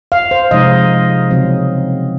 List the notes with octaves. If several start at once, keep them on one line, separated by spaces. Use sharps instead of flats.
F5
C5
C3 F3 G#3 D#4 D#5
C#3 F#3 C4